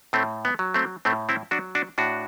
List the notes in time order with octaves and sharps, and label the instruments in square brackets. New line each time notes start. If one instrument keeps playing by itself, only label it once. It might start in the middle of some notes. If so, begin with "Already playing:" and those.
[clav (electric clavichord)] A2 A3 C4
B3
F#3
A3 C4
A2 A3 C4
C4 E4
F#3 D4 F#4
D4 F#4
A2 D4 F#4